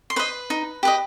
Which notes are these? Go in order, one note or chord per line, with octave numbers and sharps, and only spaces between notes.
C6
B4 C5 D#5 B5
D#4
G4 B4 D#5